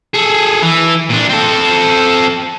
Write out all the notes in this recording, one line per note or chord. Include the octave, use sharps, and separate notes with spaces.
G#4 A4
E3
A#2 D4
C4 A4